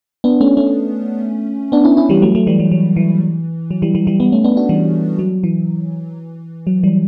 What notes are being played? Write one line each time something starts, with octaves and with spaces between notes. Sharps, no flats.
B3 D4
A3 C#4
A3 C#4
B3 D4
C#4 E4
C#4 E4
E3 G3
F#3 A3
F#3 A3
E3 G3
F#3
F#3
E3
F#3
E3 G3
E3 G3
E3 G3
G3 B3
A3 C#4
B3 D4
D4 F#4
E3 G3
F#3
E3
F#3
E3 G3